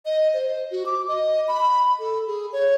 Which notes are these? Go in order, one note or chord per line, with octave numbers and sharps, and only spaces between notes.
D#5
C5
F#4
D6
D#5
B5
A4
G#4
C#5